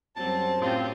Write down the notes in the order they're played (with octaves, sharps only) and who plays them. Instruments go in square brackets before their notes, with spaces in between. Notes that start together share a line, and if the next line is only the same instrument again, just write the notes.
[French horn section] F#2 C5 [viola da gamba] F#3 G3 C4 [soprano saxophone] A5
[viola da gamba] A2 C#4 G4 [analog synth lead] C4 [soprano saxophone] F4